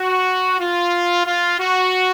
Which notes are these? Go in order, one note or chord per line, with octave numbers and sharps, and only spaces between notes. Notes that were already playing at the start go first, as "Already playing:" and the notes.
Already playing: F#4
F4
F4
F#4